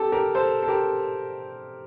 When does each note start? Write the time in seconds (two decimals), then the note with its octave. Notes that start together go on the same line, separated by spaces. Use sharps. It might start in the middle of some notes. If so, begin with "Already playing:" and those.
Already playing: G4 A4
0.12 G4 A#4
0.35 A4 C5
0.63 A4
0.68 G4 A#4